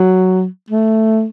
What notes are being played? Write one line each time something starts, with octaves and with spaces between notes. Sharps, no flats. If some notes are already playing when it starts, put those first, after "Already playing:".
Already playing: F#3
A3